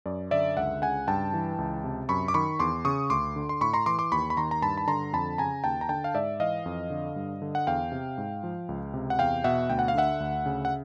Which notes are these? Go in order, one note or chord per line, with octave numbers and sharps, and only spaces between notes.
F#2 D5
D3 D5 E5
C#2 E5 F#5
C#3 F#5 G#5
G2 G5 A5
E3
C#2
C3
F#2 B5 C#6
D6
D#3 B5 C#6
E2 C6 D6
C#3 C#6 D#6
D2 C6 D6
D3
C6
A2 B5 C#6
A#5 C6
E3 C6 D6
C6 D6
D#2 B5 C#6
B5
D#3 A#5 C6
A#5
G2 A5 B5
B5
D3 A#5 C6
F2 A5 B5
C#3 G#5 A#5
D#2 G5 A5
A#5
D3 G5 A5
F5
G#2 D5 E5
E3 D#5 F5
F2
D3
G2
D3
F#5
E2 F5 G5
C3
G#2
F3
C#2
C3
F#5
E2 F5 G5
B2 E5 F#5
D2 G5
F#5
F5
D3 E5 F#5
D2
C#3
F#5